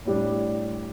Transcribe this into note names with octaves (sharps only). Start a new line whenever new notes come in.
A2 G3 D4